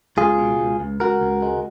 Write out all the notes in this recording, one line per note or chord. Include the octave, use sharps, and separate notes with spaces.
C#2 F4 G#4
B2
C#2
C#2
C#2 F#4 A#4
C#2
G#3